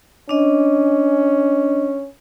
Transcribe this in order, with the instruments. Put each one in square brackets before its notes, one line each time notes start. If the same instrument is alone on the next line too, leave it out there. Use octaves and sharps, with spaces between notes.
[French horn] C#4 [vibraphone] D4 D#5